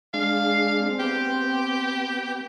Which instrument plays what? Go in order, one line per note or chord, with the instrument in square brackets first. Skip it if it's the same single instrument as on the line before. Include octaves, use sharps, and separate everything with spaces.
[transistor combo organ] G#3 D4 [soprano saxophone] F5
[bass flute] C4
[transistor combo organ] B3 [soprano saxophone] G4